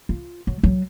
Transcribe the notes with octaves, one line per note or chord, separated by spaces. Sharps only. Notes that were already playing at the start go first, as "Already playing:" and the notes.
F4
F#3
F#3